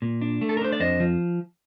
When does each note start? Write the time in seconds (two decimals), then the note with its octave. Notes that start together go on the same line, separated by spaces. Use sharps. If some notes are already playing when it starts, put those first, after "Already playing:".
0.02 A#2
0.21 D4
0.41 A3
0.49 A4
0.57 A#4
0.61 D4 C5
0.72 D5
0.80 F2 C5 D#5
1.00 F3